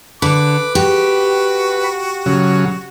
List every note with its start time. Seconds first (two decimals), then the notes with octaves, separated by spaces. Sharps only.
0.22 D3 B4 D6
0.75 F#4 G4
2.26 C#3 F#3